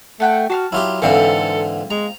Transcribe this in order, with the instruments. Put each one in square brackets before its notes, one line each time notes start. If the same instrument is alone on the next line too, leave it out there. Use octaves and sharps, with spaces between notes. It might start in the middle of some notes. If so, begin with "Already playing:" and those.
[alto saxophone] A3 [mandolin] A4 F#5 G5
[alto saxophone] F#4 [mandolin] A5 C6 F6
[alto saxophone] F#3 [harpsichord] E4 F4 G4
[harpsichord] G#2 D3 E3 [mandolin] A#3 C4 F4 [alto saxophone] A4
[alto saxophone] G#3 [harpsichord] A#5